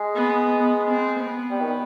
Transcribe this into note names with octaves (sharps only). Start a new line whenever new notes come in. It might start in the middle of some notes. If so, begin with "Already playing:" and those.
Already playing: G#3
B3
B3
C4
B3
G3
D#3